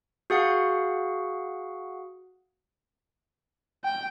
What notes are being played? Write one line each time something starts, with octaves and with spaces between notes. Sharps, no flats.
F#4 G#4 F5 F#5
G5